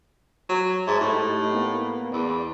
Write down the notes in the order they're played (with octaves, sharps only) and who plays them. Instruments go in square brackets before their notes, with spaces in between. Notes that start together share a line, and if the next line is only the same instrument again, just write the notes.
[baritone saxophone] F#3
[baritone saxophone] G#2 [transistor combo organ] E5 A5
[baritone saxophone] A2 [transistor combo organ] A3 D#4 G4
[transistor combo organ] A#3 B3
[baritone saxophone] E2 [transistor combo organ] D5